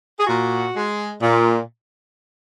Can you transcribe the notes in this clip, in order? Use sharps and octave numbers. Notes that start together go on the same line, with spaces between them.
G#4
A#2 F#4
G#3
A#2